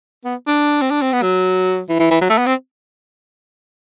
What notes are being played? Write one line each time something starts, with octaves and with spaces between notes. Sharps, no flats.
B3
D4
C4
D4
C4
B3
F#3
E3
E3
E3
F#3
A3
B3
C4